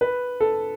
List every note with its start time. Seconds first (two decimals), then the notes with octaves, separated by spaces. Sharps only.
0.01 B4
0.40 A4